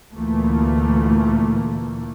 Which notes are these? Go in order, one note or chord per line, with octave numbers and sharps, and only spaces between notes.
D2 A#2 E3 A3 A#3